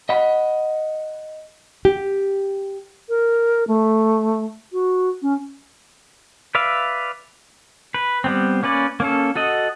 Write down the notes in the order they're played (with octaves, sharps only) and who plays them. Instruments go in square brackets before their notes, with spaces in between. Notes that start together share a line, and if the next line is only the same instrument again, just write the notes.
[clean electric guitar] D#5 F#5 B5
[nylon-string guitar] G4
[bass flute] A#4
A3
F#4
C#4
[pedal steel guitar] B4 D5 E5 F5
B4
G3 B3 C4
A#3 C#4 B4 D5
A#3 C#4 A4
F#4 A4 D#5 F#5